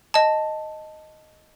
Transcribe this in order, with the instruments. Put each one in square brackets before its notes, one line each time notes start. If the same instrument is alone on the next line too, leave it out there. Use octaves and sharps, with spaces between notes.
[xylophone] D#5 A5